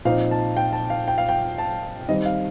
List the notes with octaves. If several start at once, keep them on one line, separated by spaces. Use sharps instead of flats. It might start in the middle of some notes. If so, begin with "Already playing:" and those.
A#2 F3 C4 D#4 F5
A5
G5
A5
F5
G5
F5
G5
A5
D#3 G3 C4 D#5
F5